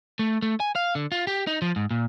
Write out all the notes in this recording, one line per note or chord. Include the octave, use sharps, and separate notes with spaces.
A3
A3
G#5
F5
D3
F4
G4
D#4
F3
G#2
A#2